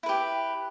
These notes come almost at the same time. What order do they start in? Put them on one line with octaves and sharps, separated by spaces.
E4 B4 G4